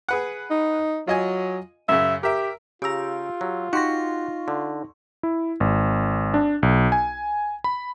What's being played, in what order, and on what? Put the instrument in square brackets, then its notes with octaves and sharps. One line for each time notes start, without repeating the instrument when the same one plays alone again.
[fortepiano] G#4 B4 F#5
[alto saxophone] D#4
[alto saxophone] F#3 [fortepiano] F4 D#5 G#5
[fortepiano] F#2 C#3 [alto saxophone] E5
[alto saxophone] G4 [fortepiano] A#4 E5
[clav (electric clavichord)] C#3 A#5 [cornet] F4 [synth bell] G4 E6
[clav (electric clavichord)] F#3
[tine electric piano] D#4 A#6 [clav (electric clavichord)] F#4 G4 F#5 [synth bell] C6 C#6
[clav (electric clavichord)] D3
[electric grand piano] E4
G#1
D4
B1
G#5
B5